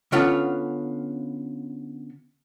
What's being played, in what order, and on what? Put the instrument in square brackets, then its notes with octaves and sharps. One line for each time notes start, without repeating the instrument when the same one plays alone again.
[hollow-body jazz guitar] D3 B3 C#4 F4 F#5